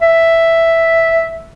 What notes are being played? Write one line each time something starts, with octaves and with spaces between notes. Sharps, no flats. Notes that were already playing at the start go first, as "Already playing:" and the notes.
E5